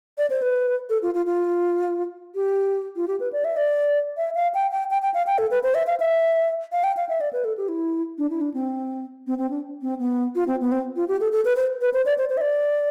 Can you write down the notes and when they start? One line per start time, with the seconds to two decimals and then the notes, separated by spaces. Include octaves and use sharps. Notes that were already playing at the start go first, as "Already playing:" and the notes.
0.18 D5
0.30 C5
0.42 B4
0.90 A4
1.02 F4
1.15 F4
1.26 F4
2.35 G4
2.96 F4
3.08 G4
3.20 B4
3.33 D5
3.45 E5
3.57 D5
4.17 E5
4.35 F5
4.54 G5
4.71 G5
4.91 G5
5.02 G5
5.14 F5
5.27 G5
5.38 A4
5.51 B4
5.63 C5
5.75 E5
5.87 F5
6.00 E5
6.72 F5
6.84 G5
6.97 F5
7.09 E5
7.21 D5
7.33 B4
7.44 A4
7.57 G4
7.68 E4
8.18 D4
8.30 E4
8.41 D4
8.54 C4
9.27 C4
9.38 C4
9.50 D4
9.82 C4
9.99 B3
10.35 F4
10.47 C4
10.61 B3
10.72 C4
10.96 F4
11.08 G4
11.20 A4
11.32 A4
11.45 B4
11.56 C5
11.81 B4
11.94 C5
12.06 D5
12.18 C5
12.29 C5
12.37 E5
12.41 D5